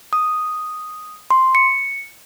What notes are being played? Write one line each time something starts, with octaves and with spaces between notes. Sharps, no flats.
D#6
C6
C#7